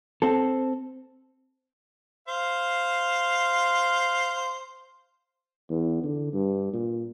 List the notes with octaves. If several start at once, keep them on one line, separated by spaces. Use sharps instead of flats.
C4 A4
C5 F5
E2
D3
G2
A#2